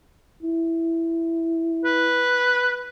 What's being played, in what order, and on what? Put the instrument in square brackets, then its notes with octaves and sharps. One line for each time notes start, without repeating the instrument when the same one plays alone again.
[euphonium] E4
[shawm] B4